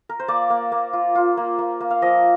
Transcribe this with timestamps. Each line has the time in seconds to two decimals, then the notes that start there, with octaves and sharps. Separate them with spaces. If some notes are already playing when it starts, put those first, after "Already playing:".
0.09 A#4
0.19 C5
0.28 A#3 D5
0.50 A#3
0.72 A#3
0.93 F4
1.15 F4
1.37 A#3
1.59 A#3
1.81 A#3
1.90 F5
2.02 F3 D#5